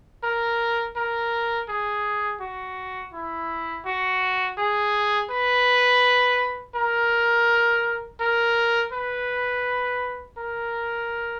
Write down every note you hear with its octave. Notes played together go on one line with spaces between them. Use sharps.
A#4
A#4
G#4
F#4
E4
F#4
G#4
B4
A#4
A#4
B4
A#4